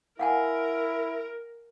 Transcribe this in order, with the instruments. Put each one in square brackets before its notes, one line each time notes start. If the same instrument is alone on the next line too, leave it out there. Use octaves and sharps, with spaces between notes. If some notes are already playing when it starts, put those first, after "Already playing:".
[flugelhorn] E4 [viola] A#4 [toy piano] F5 F#5 G#5